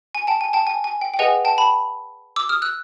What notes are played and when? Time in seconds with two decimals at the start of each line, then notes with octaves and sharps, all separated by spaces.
0.15 G#5
0.27 G5 A5
0.41 G#5
0.53 G5 A5
0.67 G#5
0.84 G#5
1.01 G5
1.14 G5
1.19 G#4 B4 D#5 F#5 G#5
1.45 G5 A5
1.58 A5 B5
2.36 D6 E6
2.49 D#6 F6
2.62 E6 F#6